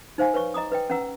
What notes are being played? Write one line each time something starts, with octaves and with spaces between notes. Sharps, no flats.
D#4 C5 F5 G#5
B4 C#5 C#6
D#5 A#5 D6 D#6
B4 D#5 G5
C#4 B4 F#5 A#5 E6